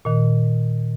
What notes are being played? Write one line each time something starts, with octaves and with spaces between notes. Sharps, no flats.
A#2 D#3